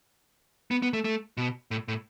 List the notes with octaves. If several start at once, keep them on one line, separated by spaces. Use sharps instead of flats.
B3
B3
A3
A3
B2
A2
A2